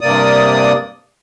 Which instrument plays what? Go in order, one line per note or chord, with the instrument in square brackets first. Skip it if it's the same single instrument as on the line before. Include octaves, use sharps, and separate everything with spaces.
[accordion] G2 C3 A#3 D5 D#6